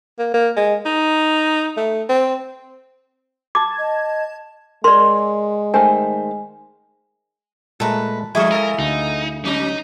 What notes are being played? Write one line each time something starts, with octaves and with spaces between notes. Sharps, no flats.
A#3
A#3
G#3
D#4
A3
C4
A5 D6 G#6
D#5
G#3 A#4 D5 C6
D#3 A3 C5 G#5
A#2 G#3 A3 A4 B4 A#5
F3 G#3 A3 E4 G#4 F5
A4 A#4 D#5
D2 D#4
F#3 C#4 D#4